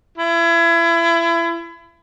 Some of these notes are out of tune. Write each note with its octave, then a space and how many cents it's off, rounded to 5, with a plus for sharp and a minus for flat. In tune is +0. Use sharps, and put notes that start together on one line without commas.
E4 +30